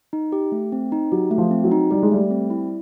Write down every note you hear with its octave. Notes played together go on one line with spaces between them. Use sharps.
D#4
G4
A3
C4
D#4
F#3 G4
A3
F3
C4
F#3
D#4
G3 G4
G#3
G3 A3
C4
E4